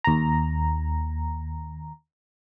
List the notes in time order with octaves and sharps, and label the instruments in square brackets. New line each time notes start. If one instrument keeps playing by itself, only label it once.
[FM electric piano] D#2 A#5